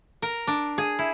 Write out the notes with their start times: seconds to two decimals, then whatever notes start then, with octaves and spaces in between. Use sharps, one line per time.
0.22 A#4
0.47 D4
0.78 G#4
0.99 E4